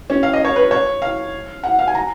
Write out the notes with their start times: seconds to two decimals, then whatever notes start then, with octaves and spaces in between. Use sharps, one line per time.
0.10 C#4
0.23 F5
0.33 D#5
0.45 C#5
0.56 B4
0.71 C#5
1.02 F5
1.63 F#5
1.79 F5
1.88 G#5
1.95 A#5